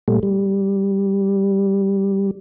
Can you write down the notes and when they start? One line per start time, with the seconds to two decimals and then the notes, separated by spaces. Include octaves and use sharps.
0.08 A#2 G3 A3
0.23 G3